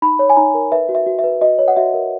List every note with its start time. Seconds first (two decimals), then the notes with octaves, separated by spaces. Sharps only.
0.02 D#4 B5
0.19 C#5
0.30 G#5
0.37 D#4 A#5
0.54 A#4
0.72 B4 E5
0.89 F#4
0.95 E5
1.06 F#4
1.19 E5
1.24 B4
1.41 F#4 D#5
1.59 C#5
1.68 F#5
1.76 F#4 E5
1.94 A#4